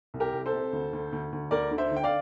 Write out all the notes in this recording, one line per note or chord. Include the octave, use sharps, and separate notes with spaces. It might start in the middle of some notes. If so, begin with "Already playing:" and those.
C2
G4 A#4
C2
A4 C5
C3
D2
D2
D2
D2
D2 A#4 D5
D3
C5 E5
D3
G5
D5 F5